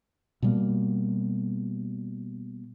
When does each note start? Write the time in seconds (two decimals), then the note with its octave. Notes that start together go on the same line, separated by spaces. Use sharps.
0.42 B2 G3 A#3